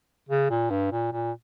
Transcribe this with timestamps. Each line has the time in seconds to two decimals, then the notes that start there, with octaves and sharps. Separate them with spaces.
0.29 C#3
0.50 A#2
0.70 G2
0.91 A#2
1.13 A#2